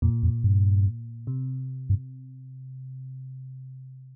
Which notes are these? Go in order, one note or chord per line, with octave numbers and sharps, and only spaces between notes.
F2 A#2
F2
G2
C3
G2